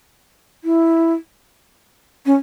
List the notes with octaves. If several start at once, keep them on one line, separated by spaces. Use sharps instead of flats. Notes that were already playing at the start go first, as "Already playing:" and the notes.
E4
C#4